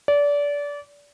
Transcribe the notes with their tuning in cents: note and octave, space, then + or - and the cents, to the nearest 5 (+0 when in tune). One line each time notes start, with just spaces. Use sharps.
D5 -25